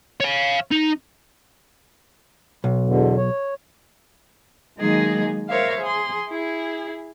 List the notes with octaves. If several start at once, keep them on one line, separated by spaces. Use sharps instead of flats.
C#5 F5
D#4
B1
E2 B2 D3
C#5
D#3 F#3 G#3 A#3 D#4 G#4
A#4 C5 C#5 E5 F5
G#4 C6
E4 G#4